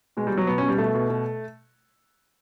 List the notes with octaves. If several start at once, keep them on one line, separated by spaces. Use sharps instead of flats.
B2 G#3
G3
B2
F#3
B2 B3
B2 C#4
G3
B2 A3
B2
B2